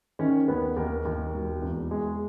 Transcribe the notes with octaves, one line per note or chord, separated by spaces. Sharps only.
D#3 C#4 C#5
D#2 B3 B4
D#2 A#4
D#2
E1
E2
G#3 G#4